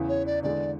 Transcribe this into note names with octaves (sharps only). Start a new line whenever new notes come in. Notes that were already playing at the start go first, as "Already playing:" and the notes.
Already playing: E2 C#3 E3
C#5
D5
E2 D3 G#3 D5